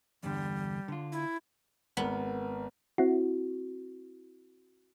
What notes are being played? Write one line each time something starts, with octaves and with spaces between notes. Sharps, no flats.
E2 G2 D3 G3
D3 F4
E4
G#1 B3 A#4
C4 E4 F#4